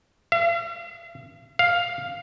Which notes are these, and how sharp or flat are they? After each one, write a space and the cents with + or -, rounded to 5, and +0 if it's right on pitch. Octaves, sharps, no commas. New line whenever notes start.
F5 -45
F5 +5